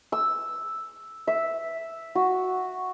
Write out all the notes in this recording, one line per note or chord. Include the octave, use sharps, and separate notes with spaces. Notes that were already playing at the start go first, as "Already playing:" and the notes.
E6
E5
F#4